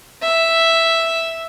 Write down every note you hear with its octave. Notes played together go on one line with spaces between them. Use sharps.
E5